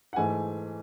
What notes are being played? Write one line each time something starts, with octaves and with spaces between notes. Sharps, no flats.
F#5
G#2 E3 A3 G#5